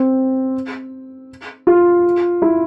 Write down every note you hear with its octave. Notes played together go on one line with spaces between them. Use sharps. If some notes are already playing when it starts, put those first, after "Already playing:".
Already playing: C4
F4
E4